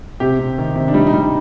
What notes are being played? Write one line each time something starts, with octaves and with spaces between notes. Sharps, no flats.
C3 G4
C3
D#3
C3
D4
G3 D#4
D#4
G3
D#4